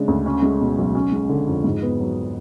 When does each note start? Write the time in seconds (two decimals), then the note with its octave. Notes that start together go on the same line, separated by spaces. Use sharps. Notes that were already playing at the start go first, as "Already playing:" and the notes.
Already playing: C#3 G#3 D4
0.08 D2
0.26 C#4
0.42 G#3
0.61 B2
0.78 B1
0.95 C#4
1.12 G#3
1.29 D3
1.47 F2
1.64 G#2
1.82 B3
2.00 F#3